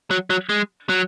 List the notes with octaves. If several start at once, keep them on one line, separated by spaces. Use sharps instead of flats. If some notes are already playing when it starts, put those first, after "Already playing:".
F#3
F#3
G#3
F#3